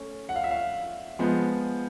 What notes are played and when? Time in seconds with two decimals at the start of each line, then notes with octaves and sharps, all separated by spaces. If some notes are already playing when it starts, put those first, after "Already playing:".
Already playing: A3 C#4
0.29 F#5
0.36 F5
0.44 E5
0.51 F5
1.19 F3 G#3 B3